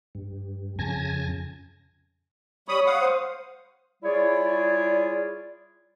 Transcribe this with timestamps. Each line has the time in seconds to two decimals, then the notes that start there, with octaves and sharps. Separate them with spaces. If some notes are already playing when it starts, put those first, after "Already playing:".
0.15 G2
0.79 F2 C#3 G#5 A5 G#6 A#6
2.68 G3 C#5 B5 D#6
2.86 F5 F#5 D#6
3.01 C5
4.03 G3 E4 F4 G#4 C#5 D5